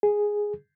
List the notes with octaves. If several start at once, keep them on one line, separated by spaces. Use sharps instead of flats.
G#4